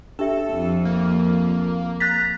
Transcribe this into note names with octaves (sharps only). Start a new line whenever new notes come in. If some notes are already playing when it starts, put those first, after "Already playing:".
D4 G4 A4 E5
F2
A#3
A#5 F#6 A6 B6